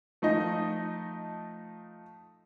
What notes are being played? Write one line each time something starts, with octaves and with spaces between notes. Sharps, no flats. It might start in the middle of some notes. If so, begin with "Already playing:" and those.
F3 A3 D#4 D#5